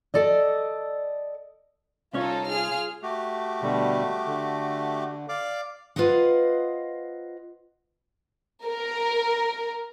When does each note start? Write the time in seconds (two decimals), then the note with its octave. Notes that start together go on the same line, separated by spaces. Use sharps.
0.14 A4 D5 D#5
2.13 C2 C#4 D#4 F4 A4 C#5
2.48 F4 G#4 F6
3.02 A3 F#4 G4
3.62 B2 D3 G3
4.26 D3
5.29 D5 F5 D6
5.96 F4 B4 C5 D#5 F#5
8.65 A#4